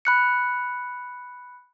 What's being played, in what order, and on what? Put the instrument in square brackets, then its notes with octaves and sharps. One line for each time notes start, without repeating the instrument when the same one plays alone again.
[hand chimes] B5 F#6 C#7